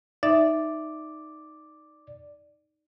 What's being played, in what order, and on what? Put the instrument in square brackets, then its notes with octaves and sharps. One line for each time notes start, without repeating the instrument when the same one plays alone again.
[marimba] D#4 E5 [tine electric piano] D5